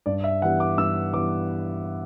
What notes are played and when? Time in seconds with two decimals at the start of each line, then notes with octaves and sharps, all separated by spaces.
0.06 G2 D5
0.24 E5
0.42 E3 G3 B3 F#5
0.60 D6
0.77 G2 E6
1.13 E3 G3 B3 D6